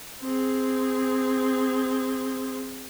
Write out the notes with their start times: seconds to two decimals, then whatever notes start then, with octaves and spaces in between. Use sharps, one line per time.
0.22 C4 G#4